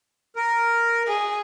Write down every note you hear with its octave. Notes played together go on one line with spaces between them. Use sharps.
A#4
G#4